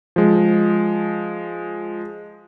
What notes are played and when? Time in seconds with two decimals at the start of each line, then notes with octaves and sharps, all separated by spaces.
0.16 F3 G#3